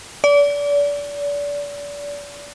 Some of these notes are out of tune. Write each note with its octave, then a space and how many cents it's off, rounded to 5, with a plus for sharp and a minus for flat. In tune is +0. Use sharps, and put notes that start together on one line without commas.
D5 -30